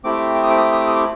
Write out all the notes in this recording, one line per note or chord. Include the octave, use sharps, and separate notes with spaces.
A3 C4 E4 G4 D6
D6
D#6
D6
D#6
D6
D#6
D6
D#6
D6